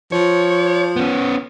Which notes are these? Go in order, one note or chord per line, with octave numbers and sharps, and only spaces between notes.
F3 C#5
B3 C#4